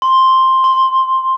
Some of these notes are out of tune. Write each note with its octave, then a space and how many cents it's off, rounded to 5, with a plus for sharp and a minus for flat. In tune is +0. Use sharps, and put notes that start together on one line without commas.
C6 +5
C6 +15